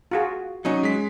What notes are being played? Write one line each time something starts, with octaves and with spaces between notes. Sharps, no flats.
F4 F#4 G#4
F#3 C#4 D#4 D#5
G#3 B6